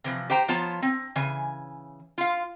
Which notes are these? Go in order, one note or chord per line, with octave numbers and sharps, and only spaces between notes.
C3 E3 F3
G4 C5 G5 A#5
F3 B3 F4 C#5 A5 A#5
C4
C#3 E3 G#5
F4 F5